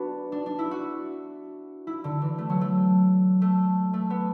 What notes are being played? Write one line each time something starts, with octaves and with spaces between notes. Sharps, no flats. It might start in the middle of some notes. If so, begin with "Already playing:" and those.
Already playing: B3 D4 F#4
D4
D4
E4
F#4
E4
D3
E3
A3
F#3
A3
A3
A3
B3